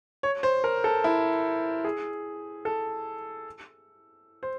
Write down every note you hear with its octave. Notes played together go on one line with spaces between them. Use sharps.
C#5
C5
A#4
A4
E4
G#4
A4
C5